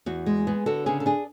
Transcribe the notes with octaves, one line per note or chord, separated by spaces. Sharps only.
E2 F#4
G#3
B3 G#4
D3 F#4 A4
C#3 G#4
A4
D4 G#4